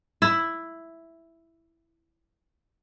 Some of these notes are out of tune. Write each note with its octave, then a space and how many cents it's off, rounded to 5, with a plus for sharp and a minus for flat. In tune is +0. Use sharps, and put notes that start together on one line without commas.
E4 +5